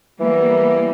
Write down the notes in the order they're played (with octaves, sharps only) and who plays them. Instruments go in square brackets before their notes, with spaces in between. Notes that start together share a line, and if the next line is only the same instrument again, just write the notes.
[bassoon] E3 [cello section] G3 A#3 B3